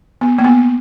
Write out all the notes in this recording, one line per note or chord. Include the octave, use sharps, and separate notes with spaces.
B3
A#3
B3